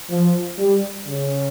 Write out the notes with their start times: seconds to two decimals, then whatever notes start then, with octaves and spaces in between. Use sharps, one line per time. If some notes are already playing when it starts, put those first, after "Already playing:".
0.11 F3
0.59 G3
1.08 C#3